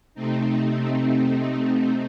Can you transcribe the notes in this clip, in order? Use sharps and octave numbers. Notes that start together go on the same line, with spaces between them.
C3 A3 C4 D#4